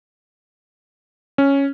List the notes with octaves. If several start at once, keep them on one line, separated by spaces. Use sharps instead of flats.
C#4